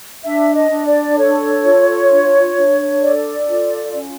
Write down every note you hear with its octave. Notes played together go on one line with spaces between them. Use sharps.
D4 E5
D#5
D4
D5
A4 C#5
F4
D4
D4
A4 D5
F4
C#4